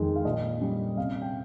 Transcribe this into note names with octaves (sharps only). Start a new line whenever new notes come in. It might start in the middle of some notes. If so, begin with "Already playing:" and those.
Already playing: F2 D#3 G#3
F5
A#2 D#5
G3 C#4
C3 F5
G5